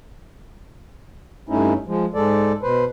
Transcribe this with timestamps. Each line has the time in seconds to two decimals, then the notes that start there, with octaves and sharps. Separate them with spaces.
1.49 G2 A3 C#4 D#4 E4
1.87 F3 G#3
2.14 G#2 G#3 A4 D5
2.62 B2 B4 C5